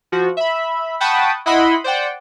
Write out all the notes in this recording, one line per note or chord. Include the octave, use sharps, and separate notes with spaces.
F3 F#4
E5 B5
F#5 G5 A5 B5 C#6 D#6
E4 D#5 F#5 B5 C6
C5 D5 F#5 G5